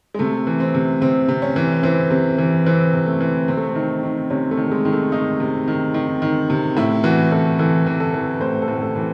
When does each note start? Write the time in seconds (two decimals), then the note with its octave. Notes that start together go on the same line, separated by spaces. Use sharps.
0.14 G#3
0.19 C3 A3
0.47 E3
0.60 C4
0.74 C3
1.02 C3 C4
1.29 C3
1.42 C#4
1.56 E3
1.83 E3 C4
2.10 C3
2.38 E3
2.66 E3 C4
2.93 C3
3.06 A3
3.21 E3
3.48 C3 C4
3.57 A3
3.68 C4
3.75 D#3
4.03 D#3
4.30 C3 C#4
4.51 A3
4.57 D#3
4.71 G#3
4.85 D#3
4.92 A3
5.12 D#3 D#4
5.40 C3
5.68 D#3
5.94 D#3
6.22 D#3
6.50 C3
6.77 A2 E4
7.04 E3 F#4
7.31 E3 A4
7.59 E3 A4
7.86 E3
8.00 A4
8.14 E3
8.41 A2 C5
8.62 A4
8.68 A2
8.82 A4
8.96 E3